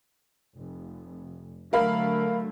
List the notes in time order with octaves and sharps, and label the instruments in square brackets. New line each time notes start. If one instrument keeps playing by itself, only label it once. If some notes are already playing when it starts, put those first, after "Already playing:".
[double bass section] F1
[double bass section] D3 F#3 A3 [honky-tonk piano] A#4 F5 B5